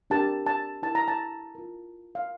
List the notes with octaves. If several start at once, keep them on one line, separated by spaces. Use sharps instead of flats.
D4 G4 A#4 A5
A5
E4 A#4 A5
A#5
A5
F4 A#4
F5